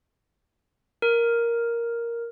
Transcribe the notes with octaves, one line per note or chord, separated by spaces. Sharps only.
A#4